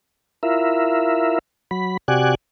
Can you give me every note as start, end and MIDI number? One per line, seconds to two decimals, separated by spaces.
0.43 1.39 64
0.43 1.39 65
0.43 1.39 70
0.43 1.39 76
1.71 1.97 54
1.71 1.97 83
2.08 2.35 48
2.08 2.35 66
2.08 2.35 67
2.08 2.35 74
2.08 2.35 80
2.08 2.35 90